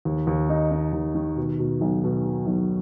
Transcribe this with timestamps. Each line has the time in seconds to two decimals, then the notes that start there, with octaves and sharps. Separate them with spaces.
0.05 D#2
0.27 D#2
0.49 D#4
0.71 D#4
0.93 D#2
1.15 D#3
1.37 B2
1.59 B2
1.81 B1
2.04 B2
2.25 F#3
2.47 B1